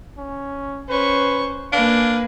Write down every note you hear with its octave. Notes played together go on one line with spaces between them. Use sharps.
C#4
C#4 B4 C5 C#6
A#3 D4 B4 F5 G#5